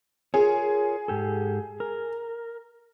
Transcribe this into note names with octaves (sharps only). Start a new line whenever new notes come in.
F4 G#4 A#4 C#5
G#2 G4 A4
A#4